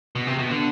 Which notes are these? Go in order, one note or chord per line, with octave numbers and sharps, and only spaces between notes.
B2
C3
B2
D3